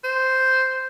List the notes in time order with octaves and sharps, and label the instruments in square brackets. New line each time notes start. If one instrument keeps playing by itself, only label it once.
[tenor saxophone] C5